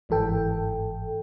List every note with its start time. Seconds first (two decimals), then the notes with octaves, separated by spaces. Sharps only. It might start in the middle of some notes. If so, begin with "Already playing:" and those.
0.09 G1 G#2 E3 A4 G5